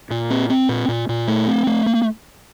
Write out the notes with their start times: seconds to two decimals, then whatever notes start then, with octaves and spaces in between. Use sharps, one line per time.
0.11 A#2
0.30 C4
0.50 C4
0.69 A#2
0.88 A#2
1.09 A#2
1.28 A3
1.47 C4
1.67 A3
1.86 A#3